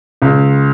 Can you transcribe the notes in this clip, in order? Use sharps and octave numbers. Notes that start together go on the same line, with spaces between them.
C#2